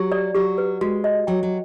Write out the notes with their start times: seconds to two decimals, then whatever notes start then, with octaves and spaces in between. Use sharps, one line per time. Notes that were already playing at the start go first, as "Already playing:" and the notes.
Already playing: F#3 G4
0.12 D5
0.35 F#3 G4
0.58 B4
0.81 G#3 F#4
1.04 D#5
1.27 F#3 G5
1.43 F#3